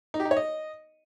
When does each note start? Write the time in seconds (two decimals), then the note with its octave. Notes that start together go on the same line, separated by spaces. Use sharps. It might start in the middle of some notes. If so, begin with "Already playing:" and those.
0.14 D#4
0.20 G4
0.25 D#4
0.31 C#5
0.37 D#5